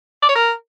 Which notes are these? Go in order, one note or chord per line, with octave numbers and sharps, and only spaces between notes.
D5
C#5
A#4